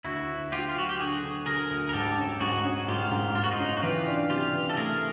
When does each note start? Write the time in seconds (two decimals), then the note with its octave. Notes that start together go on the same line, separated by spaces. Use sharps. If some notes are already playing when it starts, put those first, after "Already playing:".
0.04 D2 E4 F#4
0.29 D2
0.52 D2 F4 G4
0.69 F4
0.76 F#3 F#4
0.89 G4
0.99 D3 F#4 G#4
1.23 D3
1.46 D3 G#4 A#4
1.70 D2
1.89 A#4
1.93 G#2 G4 A4
2.18 C#4
2.40 G#2 F#4 G#4
2.64 C#4
2.88 G#2 F4 G4
3.11 G#2
3.35 G#2 F4
3.44 F#4
3.52 D#4 F4
3.60 C#4
3.77 F#4
3.82 E3 F4 G4
4.07 D4
4.30 C3 F4 G4
4.53 E3
4.69 A4
4.77 A3 G#4 A#4